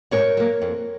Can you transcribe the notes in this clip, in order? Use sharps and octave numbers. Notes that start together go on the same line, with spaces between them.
G#2 A#4 C#5
F#3 A#3
F2